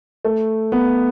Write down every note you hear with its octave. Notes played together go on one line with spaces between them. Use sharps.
A3
B3